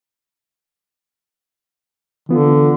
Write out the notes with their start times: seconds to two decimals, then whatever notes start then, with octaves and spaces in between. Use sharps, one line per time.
2.29 D3 E3 B3 F4